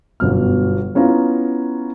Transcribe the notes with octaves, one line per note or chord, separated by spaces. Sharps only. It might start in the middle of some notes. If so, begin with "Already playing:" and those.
G1 F#2 B2 F6
B3 C#4 E4 F4 A#5